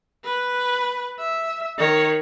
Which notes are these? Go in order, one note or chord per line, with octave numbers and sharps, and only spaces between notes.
B4
E5
D#3 C#5